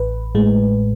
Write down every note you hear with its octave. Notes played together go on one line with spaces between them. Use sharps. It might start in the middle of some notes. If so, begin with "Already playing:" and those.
Already playing: A1 B4
A2 G#3